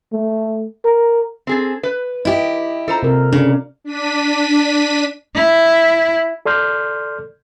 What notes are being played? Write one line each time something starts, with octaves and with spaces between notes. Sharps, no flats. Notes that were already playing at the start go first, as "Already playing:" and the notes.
A3
A#4
C4 G#4 A4
B4
E4 G4 D#5
F4 A4 C5 A#5
C3 A#4
C#3 D4
D4 B6 D#7
E4
A4 D5 C6 F6 G6